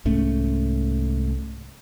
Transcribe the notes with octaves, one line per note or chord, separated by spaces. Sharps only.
C2 G#2 A3 C#4